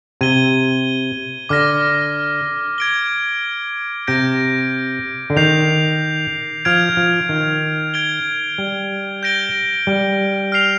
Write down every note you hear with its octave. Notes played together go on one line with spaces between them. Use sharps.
C3 G#6 D#7 G7
D3 D6 F6 A#6
G#6 D7 G7
C3 G6 A#6 D7
D3
D#3 G6 C7 F7
F3 F6 G#6 D7 F7
F3
D#3
G#6 D7 G7
G3
G6 A#6 D7 G7
G3
F6 C7 F7